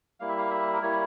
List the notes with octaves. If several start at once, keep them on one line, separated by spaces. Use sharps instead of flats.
G3 A#3 E4 F5
E5
F5
E5
A#4
G3 A#3 E4 C#5